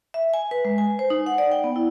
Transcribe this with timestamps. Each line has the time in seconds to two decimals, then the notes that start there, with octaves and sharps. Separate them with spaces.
0.14 E5
0.34 G#5
0.51 B4
0.65 G#3
0.78 G#5
0.99 C5
1.10 D#4
1.26 F#5
1.38 D5
1.52 G5
1.64 B3
1.76 E4